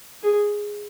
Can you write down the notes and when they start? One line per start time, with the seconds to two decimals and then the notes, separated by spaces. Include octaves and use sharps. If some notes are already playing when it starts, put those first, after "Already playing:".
0.23 G#4